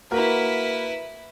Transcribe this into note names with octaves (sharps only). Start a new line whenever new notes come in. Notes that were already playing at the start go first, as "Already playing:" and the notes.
A#3 E4 F#4 A#4 B4